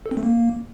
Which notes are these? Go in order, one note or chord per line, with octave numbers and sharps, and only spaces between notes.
A4
C4
A3
A#3